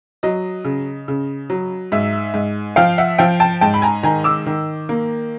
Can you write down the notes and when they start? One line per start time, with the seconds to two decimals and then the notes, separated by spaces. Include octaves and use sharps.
0.23 F#3 D#5
0.64 C#3
1.08 C#3
1.50 F#3
1.92 G#2 E5
2.34 G#2
2.76 F3 F5 G5
2.98 E5 F#5
3.18 F3 F5 G5
3.40 G5 A5
3.61 G#2 G5 A5
3.74 B5
3.82 G#5 A#5
4.03 D#3 G#5 A#5
4.24 D6 E6
4.46 D#3
4.89 A#3